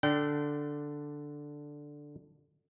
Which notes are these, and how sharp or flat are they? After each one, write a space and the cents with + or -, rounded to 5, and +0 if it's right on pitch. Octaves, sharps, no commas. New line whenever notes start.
D3 +0 D4 +0 G5 -30